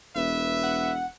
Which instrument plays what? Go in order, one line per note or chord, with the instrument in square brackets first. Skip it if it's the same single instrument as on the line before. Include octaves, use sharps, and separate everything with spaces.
[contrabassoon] E1 [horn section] B4 E5
[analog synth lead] F#5